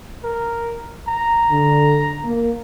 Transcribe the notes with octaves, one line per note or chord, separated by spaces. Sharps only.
A#4
A#5
D3
A#3